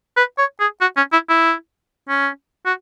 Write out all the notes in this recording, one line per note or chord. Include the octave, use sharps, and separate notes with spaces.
B4
C#5
G#4
F#4
C#4
E4
E4
C#4
F#4